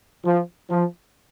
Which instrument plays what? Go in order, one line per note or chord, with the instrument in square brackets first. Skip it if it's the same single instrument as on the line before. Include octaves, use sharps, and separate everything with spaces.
[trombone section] F3
F3